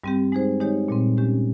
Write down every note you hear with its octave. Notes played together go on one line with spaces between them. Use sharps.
G2 G3 C4 G4
G#3 D#4 G#4 C5
D#3 G#3 D#4 G4 C#5
A#2 G3 C4
G#3 C#4 G4